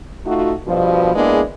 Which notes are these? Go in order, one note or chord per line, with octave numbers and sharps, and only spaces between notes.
A3 D#4 F4 F#4
G2 B2 F3
G#3 A#3 B3 D4 E4 G#4